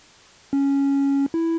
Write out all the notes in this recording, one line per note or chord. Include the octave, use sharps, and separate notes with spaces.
C#4
E4